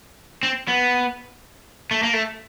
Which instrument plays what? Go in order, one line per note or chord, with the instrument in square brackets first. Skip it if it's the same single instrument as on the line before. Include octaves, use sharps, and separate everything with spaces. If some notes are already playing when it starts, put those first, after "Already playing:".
[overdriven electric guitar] C4
B3
A3
A#3
A3